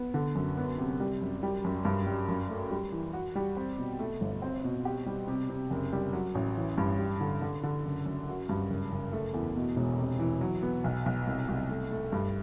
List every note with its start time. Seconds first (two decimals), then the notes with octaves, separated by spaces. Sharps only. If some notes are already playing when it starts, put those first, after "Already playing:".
Already playing: B3
0.14 D3
0.35 F#2
0.57 B3
0.78 C3
1.00 G3
1.21 F#2
1.43 G3
1.64 F#2
1.85 G2
2.06 G3
2.28 F#2
2.49 A3
2.71 G3
2.92 E3
3.13 F#4
3.35 G3
3.57 C4
3.78 B2
3.99 A3
4.21 G1
4.42 C4
4.64 B2
4.85 G4
5.06 G3
5.28 C3
5.50 C3
5.70 F#1
5.93 G3
6.13 F#3
6.35 A1
6.57 E3
6.78 G2
6.99 G3
7.21 D3
7.41 D3
7.63 D3
7.85 F#1
8.06 F#2
8.28 F#4
8.49 G2
8.70 F#1
8.92 F#1
9.13 A3
9.34 E2
9.56 B2
9.77 E1
9.99 C3
10.19 E3
10.41 F#3
10.63 B3
10.84 B1
11.06 B1
11.27 C2
11.49 C2
11.70 A3
11.91 A3
12.12 G2